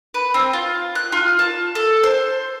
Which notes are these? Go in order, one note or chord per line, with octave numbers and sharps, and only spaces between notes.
B4
C4
F4
F#6
F4
A5
A4
C5